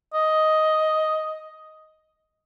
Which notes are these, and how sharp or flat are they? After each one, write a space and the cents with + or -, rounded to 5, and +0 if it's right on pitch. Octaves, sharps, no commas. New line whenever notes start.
D#5 +5